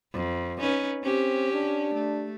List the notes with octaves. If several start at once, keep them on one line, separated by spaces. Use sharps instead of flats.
F2
C#4 D#4 B4
C4 C#4 G4
D4
A3